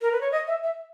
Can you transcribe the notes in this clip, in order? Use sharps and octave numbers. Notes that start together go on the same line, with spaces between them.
A#4
B4
C#5
D#5
E5
E5